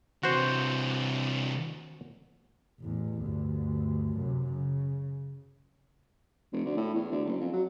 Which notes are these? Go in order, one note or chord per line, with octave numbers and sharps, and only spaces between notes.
C3 E3 F#4 C5
A1 E2
D2 G2
F#2 C3
C#3
F1
D2
A2
E2
D2
F#1
F2
F#3